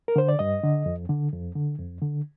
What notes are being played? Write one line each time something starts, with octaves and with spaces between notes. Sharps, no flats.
A#4
D3 C5
D5
G2 D#5
D3
F2
D3
F2
D3
F2
D3